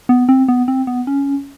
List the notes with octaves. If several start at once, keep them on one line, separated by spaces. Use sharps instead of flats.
B3
C4
B3
C4
B3
C#4